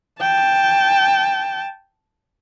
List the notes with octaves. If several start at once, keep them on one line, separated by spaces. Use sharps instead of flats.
G5 A5